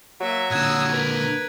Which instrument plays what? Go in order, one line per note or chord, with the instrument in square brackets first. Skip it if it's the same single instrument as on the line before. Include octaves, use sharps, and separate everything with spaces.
[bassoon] F#3 [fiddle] A#3 E5
[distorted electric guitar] A#2 D3 [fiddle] D#6 E6 [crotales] F#6 G#6
[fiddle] A#4 B4